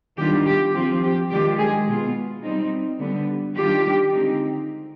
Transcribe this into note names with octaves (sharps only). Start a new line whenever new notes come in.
D#3 G3 B3 D4 F4 G4
G4
F3 C4 F4 G4
G4
D#3 G#3 D4 F4 G4
G#3 G#4
B2 B3 F4
G3 C4 D#4
D3 G3 B3
D#3 G3 D4 F4 G4
D3 G#3 C4 D#4